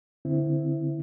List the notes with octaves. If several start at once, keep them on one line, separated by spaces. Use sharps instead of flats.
D3 C4 E4